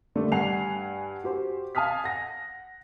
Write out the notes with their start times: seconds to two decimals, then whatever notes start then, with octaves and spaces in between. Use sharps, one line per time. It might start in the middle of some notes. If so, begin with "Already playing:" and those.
0.15 D3 G3 A3 D4
0.32 G2 F#5 G#5 C7 F7
1.24 F#4 G4 C5
1.75 F5 G#5 A5 D#6 F6 B6
2.04 F#5 A#6